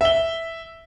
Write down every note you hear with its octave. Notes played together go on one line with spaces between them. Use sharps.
E5 G7